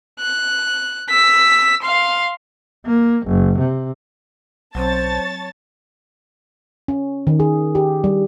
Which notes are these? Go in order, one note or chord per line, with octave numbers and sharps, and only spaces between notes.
F#6
E6 B6
F5 C6
A#3
F#1
C3
B1 F#3 C4 C5 C#5 A5 A6
C#4
D#3
G#4
G4
G3